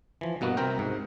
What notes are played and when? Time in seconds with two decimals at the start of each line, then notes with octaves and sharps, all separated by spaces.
0.21 E3 F3
0.41 G2 B2 A#3 B3 F#4
0.57 C3 C4 A#4 G5
0.79 G#2